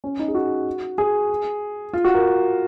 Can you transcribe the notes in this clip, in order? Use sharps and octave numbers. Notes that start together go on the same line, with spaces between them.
C#4
D#4
G#4
F#4
G#4
F4
F#4
A#4